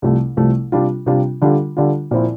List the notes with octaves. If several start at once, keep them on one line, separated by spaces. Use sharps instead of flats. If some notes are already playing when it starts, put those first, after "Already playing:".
C2 C3 F3 A3
C2 C3 F3 A3
C3 G3 D4 F4
C3 G3 D4 F4
D3 G3 D4 F4
D3 G3 D4 F4
A#2 F3 C4 E4